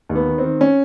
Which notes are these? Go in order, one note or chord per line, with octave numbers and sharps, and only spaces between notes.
D#2
B3
D#3
D#3 C4
C#4